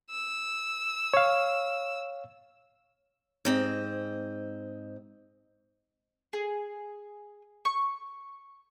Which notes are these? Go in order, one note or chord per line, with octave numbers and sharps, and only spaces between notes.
E6
C#5 F5
G#2 C4 D#5
G#4
C#6